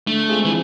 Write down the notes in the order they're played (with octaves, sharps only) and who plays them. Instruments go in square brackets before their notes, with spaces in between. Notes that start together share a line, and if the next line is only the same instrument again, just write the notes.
[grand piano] D3 [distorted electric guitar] A3
[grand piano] G#3 C4 F4 G#4
[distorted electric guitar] E3